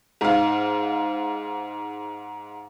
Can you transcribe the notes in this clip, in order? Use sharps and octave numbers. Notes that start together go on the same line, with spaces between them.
G#2 F5